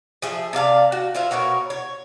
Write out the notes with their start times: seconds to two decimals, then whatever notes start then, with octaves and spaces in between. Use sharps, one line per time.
0.22 F3 G#4 E5
0.53 C3 D5 F5 A5
0.92 F#4
1.14 F4 C5 E5 F5
1.31 B2 F#4 A#4 C#5
1.70 C#5